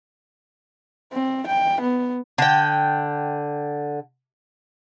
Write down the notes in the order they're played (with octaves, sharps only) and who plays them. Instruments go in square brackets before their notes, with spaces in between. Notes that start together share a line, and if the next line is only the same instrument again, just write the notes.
[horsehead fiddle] C4
G5
B3
[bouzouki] D3 G5